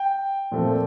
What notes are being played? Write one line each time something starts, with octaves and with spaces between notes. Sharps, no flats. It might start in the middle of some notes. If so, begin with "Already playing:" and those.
Already playing: G5
A#2 F3 A3 C4